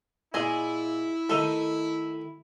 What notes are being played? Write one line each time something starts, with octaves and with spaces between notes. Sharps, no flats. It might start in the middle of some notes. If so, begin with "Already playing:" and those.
A#2 E4 G#4 D#5 G#5
D#3 A3 D#4 A4